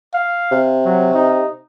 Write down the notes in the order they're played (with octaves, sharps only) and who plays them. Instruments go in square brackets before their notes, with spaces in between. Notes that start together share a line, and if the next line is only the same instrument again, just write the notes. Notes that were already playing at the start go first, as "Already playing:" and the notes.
[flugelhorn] F5
[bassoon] C3
[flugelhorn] F#3
D#4